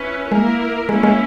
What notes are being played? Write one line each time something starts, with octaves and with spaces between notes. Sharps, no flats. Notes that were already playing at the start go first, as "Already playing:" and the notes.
Already playing: C#4 E4 B4
G#3 A#3 E4 A#4
G#3 A#3 C#4 E4
G#3